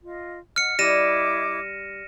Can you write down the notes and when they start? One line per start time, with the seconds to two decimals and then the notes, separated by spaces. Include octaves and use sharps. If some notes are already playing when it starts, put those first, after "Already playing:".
0.04 F4 D#5
0.56 D#5 F#5 F6 C#7
0.79 G3 E4 D#5 D6 A#6 D#7 E7